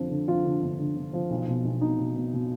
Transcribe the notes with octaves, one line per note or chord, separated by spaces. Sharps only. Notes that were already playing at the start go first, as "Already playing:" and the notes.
Already playing: F2 D3 F3
D3
F3 F4
D3
G1
D3
G1
F3
B1
B2
B1
B2 D#4
B2
B2
B2